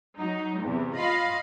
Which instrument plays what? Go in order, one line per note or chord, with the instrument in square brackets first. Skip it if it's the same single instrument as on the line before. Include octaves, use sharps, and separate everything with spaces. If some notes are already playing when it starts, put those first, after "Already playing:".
[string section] F#3 D#4
E2 C3
F4 D#5 F5 B5